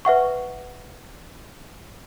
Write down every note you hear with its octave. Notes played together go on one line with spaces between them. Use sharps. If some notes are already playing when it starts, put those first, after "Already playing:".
B4 E5 F#5 C#6